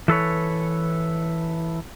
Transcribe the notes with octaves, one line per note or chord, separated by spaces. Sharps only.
E3 A4 B4 C#5